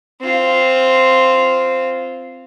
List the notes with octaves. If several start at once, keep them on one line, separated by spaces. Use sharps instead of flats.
C4 F4